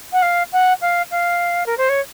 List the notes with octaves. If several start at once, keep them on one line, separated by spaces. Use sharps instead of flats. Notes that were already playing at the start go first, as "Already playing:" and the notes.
F#5
F5
F#5
F5
F5
A#4
C5
C#5